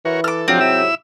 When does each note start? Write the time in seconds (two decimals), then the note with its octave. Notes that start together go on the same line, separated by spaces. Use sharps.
0.05 E3 F#4 A#4 C#5
0.24 A4 D6 F6
0.48 G#2 C3 F3 F#3 C4 D4 F4
0.61 E4 E5 E6